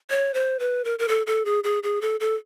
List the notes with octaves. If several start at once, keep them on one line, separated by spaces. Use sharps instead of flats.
C#5
C5
B4
A#4
A#4
A4
A4
G#4
G#4
G#4
A4
A4